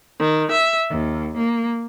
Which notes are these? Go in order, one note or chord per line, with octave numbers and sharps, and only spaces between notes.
D#3
E5
D#2
A#3